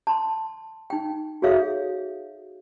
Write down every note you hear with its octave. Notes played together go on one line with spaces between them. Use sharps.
A5 C6
D#4 G5
F#4 G#4 A4 C#5 E5 F5